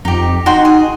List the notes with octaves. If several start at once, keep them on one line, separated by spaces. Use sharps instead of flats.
F2 D#4 G4
D#4 F#4 G5 C6
G#4